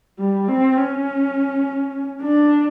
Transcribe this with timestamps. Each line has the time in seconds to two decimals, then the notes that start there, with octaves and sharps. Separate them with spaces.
0.19 G3
0.48 C4
0.77 C#4
2.22 D4